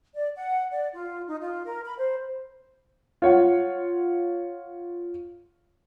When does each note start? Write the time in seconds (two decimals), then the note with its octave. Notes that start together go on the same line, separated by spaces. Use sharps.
0.15 D5
0.36 F#5
0.72 D5
0.94 F4
1.28 D#4
1.41 F4
1.65 A#4
1.85 B5
1.98 C5
3.22 F4 C#5 F#5